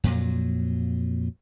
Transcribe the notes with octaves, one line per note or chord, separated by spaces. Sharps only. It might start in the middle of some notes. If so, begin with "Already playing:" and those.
F2 A#2 F#3